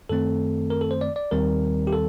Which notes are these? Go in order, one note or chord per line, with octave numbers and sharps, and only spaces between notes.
F#2 D#3 A3 C4 A4
A#4
A4
C5
D5
D5
D#2 D#3 G3 C4 A#4
G4
A4